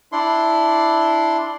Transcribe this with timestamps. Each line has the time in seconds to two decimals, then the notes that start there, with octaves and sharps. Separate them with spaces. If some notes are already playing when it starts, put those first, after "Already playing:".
0.12 D4 E4 C6